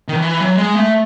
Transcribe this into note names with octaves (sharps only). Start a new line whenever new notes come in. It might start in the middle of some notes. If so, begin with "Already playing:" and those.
D#3
E3
F#3
G#3
A3